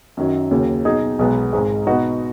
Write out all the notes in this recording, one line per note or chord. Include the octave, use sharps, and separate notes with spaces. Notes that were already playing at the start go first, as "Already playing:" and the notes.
F#2 D#3 F#3
D#2 C#3 F#3
B2 F#3 D#4 G#4
B1 B2 G#3 B3
G#1 G#2 G#3
B2 B3 D#4 F#4